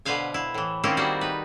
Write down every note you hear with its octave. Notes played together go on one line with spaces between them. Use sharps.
B2 D3 B4 C5 F5 G#5
E4 F5
A2 E3
D#3 A#3 C4 C#4 E4
G3 A#3 F#4 G#4 C5
D#4 B4